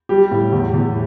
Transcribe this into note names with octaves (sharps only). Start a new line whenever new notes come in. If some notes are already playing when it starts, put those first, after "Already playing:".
G3 G4
A2
E2
E2